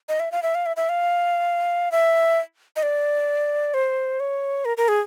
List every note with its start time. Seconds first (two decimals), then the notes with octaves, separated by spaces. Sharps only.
0.09 D#5
0.20 E5
0.32 F5
0.43 E5
0.55 F5
0.66 E5
0.77 E5
0.89 F5
1.92 E5
2.76 D#5
2.83 D5
3.74 C5
4.20 C#5
4.65 A#4
4.77 A#4
4.88 G#4